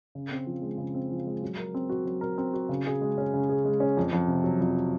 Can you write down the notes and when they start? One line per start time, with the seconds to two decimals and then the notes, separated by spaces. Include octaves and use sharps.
0.15 C#3
0.31 C4
0.47 F3
0.62 G#3
0.78 C#3
0.95 C4
1.11 F3
1.27 G#3
1.42 F#3
1.57 A#4
1.74 C4
1.89 F#4
2.05 F#3
2.21 A#4
2.38 C4
2.54 F#4
2.69 C#3
2.86 G#4
3.01 G#3
3.18 C#4
3.34 C#3
3.49 G#4
3.65 G#3
3.80 C#4
3.97 F2
4.13 F2
4.28 C3
4.44 F#3
4.61 F2